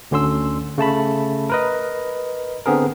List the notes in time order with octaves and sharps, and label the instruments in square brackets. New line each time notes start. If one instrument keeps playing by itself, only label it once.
[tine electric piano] D2 D3 C#4 C6 E6
C#3 A3 A5 B5
A#4 B4 D#5
D3 B3 C4 G#4 A#4